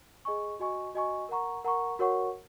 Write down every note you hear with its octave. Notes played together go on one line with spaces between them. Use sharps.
G#4 D#5 G#5 C#6
F#4 D#5 G#5 C#6
F#4 D#5 G#5 C#6
A#4 F#5 A#5 C#6
A#4 F#5 A#5 C#6
F#4 A#4 C#5 F#5 C#6